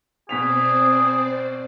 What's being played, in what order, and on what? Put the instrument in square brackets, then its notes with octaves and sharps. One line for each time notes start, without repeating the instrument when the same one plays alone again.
[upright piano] B2 B6 F7 [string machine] C4 C5 D5 [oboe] G#4